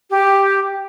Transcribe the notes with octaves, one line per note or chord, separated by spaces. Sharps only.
G4